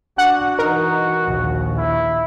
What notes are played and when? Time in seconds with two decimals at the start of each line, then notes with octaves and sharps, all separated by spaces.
0.18 D4 F#4 F#5
0.59 E3 D#4 A#4
1.24 A#1 D#2
1.77 E4